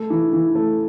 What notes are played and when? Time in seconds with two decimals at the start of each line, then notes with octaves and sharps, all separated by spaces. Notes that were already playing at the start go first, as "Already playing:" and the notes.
Already playing: A3
0.10 E3
0.33 E3
0.55 A3